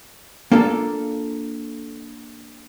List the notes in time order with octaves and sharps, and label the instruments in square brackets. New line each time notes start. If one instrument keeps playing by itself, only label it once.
[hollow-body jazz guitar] A#3 D4 F4 A4 F5